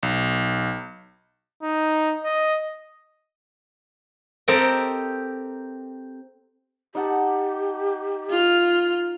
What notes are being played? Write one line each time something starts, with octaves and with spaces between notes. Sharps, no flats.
B1
D#4
D#5
C4 G4 A4 A#4 D#5
D#4 G4 F#5 A5
F4 F6